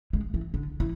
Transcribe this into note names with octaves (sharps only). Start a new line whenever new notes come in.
G#3
E3
D3
E3